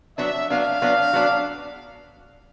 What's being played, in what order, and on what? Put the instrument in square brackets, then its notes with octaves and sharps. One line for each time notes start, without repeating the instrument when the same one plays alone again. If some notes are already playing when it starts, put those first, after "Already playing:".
[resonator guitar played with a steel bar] F#3 B3 D4 [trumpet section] E5
[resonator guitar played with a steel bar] F#3 B3 D4 [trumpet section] F5
[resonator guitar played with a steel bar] F#3 B3 D4
F#3 B3 D4